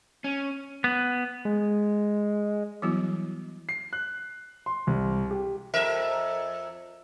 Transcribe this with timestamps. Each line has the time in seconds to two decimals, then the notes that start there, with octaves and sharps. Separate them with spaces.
0.24 C#4
0.84 B3
1.45 G#3
2.82 E3 F#3 G3 B3 E4 F#4
3.69 C7
3.93 F#6
4.66 C6
4.87 C2
5.31 G4
5.74 F2 A#4 E5